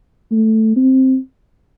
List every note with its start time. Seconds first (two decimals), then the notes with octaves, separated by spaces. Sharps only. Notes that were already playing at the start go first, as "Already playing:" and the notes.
0.31 A3
0.76 C4